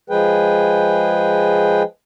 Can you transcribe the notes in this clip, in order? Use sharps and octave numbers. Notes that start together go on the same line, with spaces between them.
F3 G#3 G#4 B4 G5